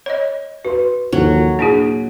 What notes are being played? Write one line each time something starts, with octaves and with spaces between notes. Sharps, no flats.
C#5 D#5
F#4 B4 C6
D#2 F3 F#3 A4
A#2 D4 E4 G#4 D7